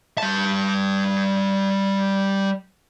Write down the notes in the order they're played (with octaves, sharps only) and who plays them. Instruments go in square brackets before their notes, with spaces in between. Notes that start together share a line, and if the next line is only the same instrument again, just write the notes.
[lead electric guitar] G3 A5